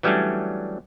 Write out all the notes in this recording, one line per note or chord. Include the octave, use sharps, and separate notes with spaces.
E3 F#3 G3 A3 C#4 D4